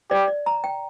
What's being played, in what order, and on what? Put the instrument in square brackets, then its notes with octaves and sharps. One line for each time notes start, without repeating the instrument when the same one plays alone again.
[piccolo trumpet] G4 [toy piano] D5
[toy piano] D5
A#5
G5